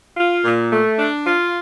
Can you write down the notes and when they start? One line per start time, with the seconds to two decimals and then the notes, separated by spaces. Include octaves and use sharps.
0.17 F4
0.43 A#2
0.72 A3
0.99 D4
1.26 F4